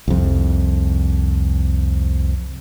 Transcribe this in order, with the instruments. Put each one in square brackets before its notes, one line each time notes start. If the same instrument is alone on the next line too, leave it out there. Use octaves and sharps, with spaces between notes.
[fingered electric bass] C2 F2